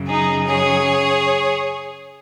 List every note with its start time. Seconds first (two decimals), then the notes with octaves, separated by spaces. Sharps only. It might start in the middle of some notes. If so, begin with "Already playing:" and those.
Already playing: F#2 C#3 F#3
0.09 D#4 G#4
0.47 G#4 C#5